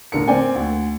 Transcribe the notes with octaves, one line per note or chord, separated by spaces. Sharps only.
A2 D3 A#4 C#7
A#3 C4 D5 G5 G#5
D2